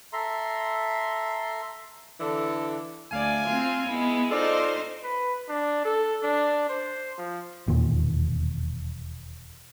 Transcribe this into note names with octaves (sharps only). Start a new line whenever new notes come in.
A4 E5 A#5 C6
D3 E3 A4
D2 D5 F5 G#5
C4 F4
G#3 B3 E4
D#4 F4 A4 C5 D5
B4
D4
A4
D4
C5
F3
E1 D#2 A#2